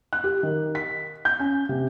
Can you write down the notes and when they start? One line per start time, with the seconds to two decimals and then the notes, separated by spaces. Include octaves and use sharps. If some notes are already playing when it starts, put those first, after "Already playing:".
0.13 F#6
0.24 G4
0.43 D#3
0.75 B6
1.25 G6
1.39 C#4
1.69 C3